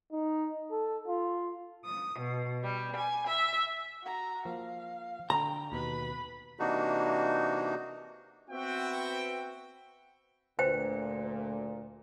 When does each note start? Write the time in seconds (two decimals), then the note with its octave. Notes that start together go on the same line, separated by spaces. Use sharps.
0.12 D#4
0.71 A4
1.07 F4
1.85 D#6
2.19 B2
2.62 G3
2.96 G#5
3.27 E5
4.03 F#4 A#5
4.45 F3 A#3 F5
5.30 D3 G5 A#5
5.72 D#2 B2 B4 B5
6.59 C3 E3 A#3 D4 D#4 F#4
8.51 B3 C4 F#4 E5 G5
10.59 D2 A#2 B4 C5 G5